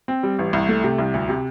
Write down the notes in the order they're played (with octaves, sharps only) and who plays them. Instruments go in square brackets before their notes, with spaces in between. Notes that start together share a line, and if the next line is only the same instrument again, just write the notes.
[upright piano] C4
G3
A1
C2
A3
C3
C2
D2
C3